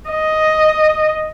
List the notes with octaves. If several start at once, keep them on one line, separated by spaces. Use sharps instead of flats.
D#5